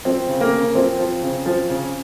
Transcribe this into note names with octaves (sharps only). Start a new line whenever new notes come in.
F3 C4
C#3
A#3
C#3
F3 C4
F3
C#3
F3
C#3